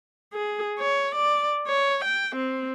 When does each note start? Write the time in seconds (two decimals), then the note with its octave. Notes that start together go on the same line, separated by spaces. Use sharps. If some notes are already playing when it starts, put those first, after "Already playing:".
0.34 G#4
0.79 C#5
1.15 D5
1.67 C#5
2.05 G5
2.36 C4